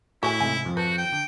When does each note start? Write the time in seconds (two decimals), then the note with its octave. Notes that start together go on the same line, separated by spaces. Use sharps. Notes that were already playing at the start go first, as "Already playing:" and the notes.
0.23 A2 E4 F#4 D#5 G#5
0.40 G#2 C3 E3 G#5
0.65 F2 F3
0.77 F#4 B4 A5 G6
0.98 G5
1.12 D3